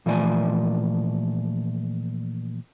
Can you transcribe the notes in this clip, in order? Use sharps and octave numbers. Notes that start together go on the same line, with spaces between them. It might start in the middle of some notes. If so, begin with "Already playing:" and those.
A#2 E3 F3 A3 D5 G#5